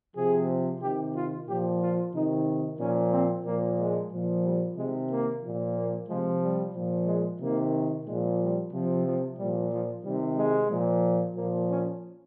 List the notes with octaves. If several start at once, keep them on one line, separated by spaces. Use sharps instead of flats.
C3 F3 G#4
C3 D#3 G4
F4
A#2 F3 G4
F4
C3 D#3 D#4
A#2 F3 C#4
C4
A#2 F3 A#3
G#3
A#2 F3
G3
C3 D#3 G#3
A#3
A#2 F3
A#3
C3 F3 G#3
G3
A#2 F3
G#3
C3 D#3 A#3
A#2 F3 G#3
G3
C3 F3
F3
A#2 F3 G3
F3
C3 D#3 G3
G#3
A#2 F3
A#2 F3 A#3
C#4